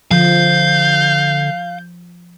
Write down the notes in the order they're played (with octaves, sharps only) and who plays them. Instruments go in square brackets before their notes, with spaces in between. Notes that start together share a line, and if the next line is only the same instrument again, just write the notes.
[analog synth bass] D3 [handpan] F3 [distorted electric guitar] F5 [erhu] G6